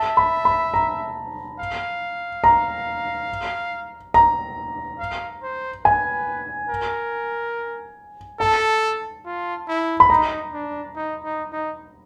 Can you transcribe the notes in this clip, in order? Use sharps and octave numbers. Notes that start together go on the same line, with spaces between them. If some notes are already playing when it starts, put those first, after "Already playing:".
Already playing: E5 A5
B5
B5
A#5
F5
A#5
A#5
F5
C5
B4 G#5
A#4
A4 A5
F4
E4
B5
D#4 A#5
D4
D#4
D#4
D#4